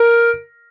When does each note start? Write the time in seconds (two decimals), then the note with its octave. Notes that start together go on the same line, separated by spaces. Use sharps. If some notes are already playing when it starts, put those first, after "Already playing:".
Already playing: A#4